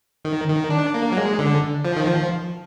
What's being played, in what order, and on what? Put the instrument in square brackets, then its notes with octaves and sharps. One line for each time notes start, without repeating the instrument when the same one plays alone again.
[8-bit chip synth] D#3
D#3
D4
A#3
F#3
G#3
D3
F3
D#3
F3